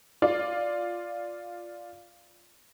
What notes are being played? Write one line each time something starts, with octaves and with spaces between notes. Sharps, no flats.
F4 D5